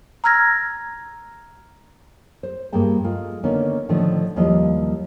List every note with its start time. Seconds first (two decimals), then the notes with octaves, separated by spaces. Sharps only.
0.24 A#5 E6 F6 G#6 A#6
2.43 C5
2.73 G2 A#3 G#4 G5 A5
3.04 G#3 F4 A4
3.43 D3 D#3 A#3 B3 C#4 D#4
3.89 A2 D3 D#3 F3 A3 D4
4.36 D#2 F3 G3 E4 D#5